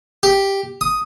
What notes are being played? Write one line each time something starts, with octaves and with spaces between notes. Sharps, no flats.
G4
D#6